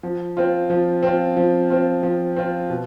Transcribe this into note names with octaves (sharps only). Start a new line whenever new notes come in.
F3
C4 F4
F3
C4 F4
F3
C4 F4
F3
C4 F4
B2